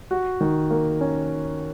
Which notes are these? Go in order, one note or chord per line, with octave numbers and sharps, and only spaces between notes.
F#4
D#3
A#3
C#4